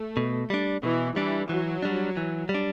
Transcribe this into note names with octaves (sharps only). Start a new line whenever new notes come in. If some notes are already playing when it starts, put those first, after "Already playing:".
Already playing: A3
B2
G3 D4
B2 E3
E3 G3 D4
E3 F#3
G3 D4
E3
G3
D4